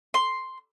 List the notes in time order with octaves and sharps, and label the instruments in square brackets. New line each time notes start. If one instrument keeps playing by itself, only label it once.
[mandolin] C6